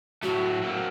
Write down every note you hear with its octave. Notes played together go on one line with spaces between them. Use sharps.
A2 F#3 A3 F#4
F#3 A#3 C4